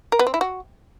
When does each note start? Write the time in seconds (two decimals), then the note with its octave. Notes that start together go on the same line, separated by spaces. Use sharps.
0.12 A#4
0.19 B3
0.27 C4
0.34 E4
0.41 F#4